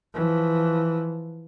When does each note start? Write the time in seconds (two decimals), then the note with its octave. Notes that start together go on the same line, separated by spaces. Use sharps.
0.14 E3 F3